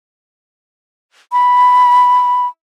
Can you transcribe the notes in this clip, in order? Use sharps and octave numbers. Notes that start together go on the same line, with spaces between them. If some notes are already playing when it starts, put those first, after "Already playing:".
B5